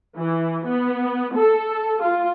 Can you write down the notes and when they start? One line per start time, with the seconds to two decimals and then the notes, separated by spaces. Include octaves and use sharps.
0.17 E3
0.66 B3
1.35 A4
2.01 F4